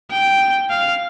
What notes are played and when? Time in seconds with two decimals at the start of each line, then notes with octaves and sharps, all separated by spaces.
0.11 G5
0.70 F5